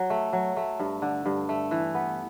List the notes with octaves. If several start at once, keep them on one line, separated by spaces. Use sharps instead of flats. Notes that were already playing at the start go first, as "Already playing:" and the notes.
Already playing: F#3
A3
F#3
A3
G2
D3
G2
A3
E3
B3